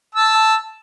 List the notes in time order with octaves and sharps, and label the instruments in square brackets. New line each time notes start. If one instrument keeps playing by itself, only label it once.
[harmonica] A5 E6